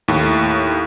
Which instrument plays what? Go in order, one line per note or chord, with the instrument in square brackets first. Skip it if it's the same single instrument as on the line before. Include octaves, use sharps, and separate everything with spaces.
[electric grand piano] D#2 A2